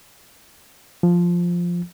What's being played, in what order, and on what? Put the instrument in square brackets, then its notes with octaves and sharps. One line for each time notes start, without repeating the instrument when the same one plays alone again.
[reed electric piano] F3